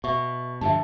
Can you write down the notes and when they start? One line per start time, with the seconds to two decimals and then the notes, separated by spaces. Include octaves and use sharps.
0.04 B2 E5 C#6
0.61 G2 D3 F3 E5 A5